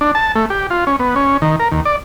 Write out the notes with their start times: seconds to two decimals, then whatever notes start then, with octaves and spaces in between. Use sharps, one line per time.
0.01 D4
0.15 A5
0.35 A3
0.50 G4
0.70 F4
0.87 C#4
0.99 B3
1.16 C#4
1.42 D#3
1.59 A#4
1.71 D#2
1.85 D5